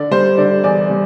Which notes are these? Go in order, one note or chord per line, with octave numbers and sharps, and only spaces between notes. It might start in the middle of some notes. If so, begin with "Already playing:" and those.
Already playing: D3 D5
G3 C5
D3 D5
E2 D5
G3